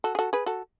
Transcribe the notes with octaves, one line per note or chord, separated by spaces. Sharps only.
F#4 A4
G#4
F#4 A4
G#4 B4
F#4 A4